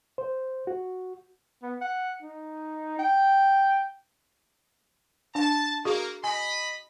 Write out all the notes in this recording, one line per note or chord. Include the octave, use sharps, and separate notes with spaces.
C5
F#4
B3
F#5
D#4
G5
D4 A5
A#3 F#4 G#4
D#5 G#5 B5